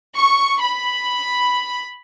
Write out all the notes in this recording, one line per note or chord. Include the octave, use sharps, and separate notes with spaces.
C#6
B5